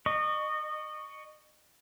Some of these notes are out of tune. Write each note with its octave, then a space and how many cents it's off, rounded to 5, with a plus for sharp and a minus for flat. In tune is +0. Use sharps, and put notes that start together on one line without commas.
D#5 -30 C#6 +15